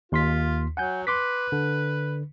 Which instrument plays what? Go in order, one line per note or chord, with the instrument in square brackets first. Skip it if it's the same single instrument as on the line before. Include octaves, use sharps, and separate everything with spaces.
[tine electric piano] D#2 C6 B6 [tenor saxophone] F4
[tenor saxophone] F#3 [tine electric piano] F#5 G#5 G6
[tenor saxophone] B4 [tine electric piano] C6 D6 B6
[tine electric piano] D3